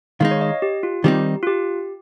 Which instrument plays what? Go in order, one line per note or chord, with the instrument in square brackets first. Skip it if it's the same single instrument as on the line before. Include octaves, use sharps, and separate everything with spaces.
[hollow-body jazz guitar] D#3 G#3 D#4 [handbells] F5
[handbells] C#5
D#5
G4
F4
[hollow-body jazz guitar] D#3 G3 C4 D#4 [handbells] G4
[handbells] F4
G4